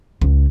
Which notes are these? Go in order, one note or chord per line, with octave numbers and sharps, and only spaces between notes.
C#2